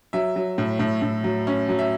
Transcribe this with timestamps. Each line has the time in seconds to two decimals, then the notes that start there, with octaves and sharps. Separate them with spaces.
0.13 F#3 E5
0.36 F#3
0.58 A2
0.79 A2
1.02 A2
1.24 F#3
1.47 C#4
1.69 F#3
1.78 E5